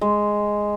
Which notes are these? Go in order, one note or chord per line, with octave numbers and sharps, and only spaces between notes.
G#3